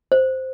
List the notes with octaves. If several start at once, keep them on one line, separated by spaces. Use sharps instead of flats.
C5